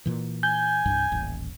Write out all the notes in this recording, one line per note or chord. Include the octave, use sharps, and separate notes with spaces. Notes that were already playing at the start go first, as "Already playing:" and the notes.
A#2 E3
G#5 G6
C2 G2
D#1 A1